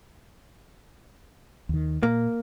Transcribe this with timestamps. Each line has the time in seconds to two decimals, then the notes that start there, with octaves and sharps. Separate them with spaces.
1.69 D#2 D#3
2.03 A#2 A#3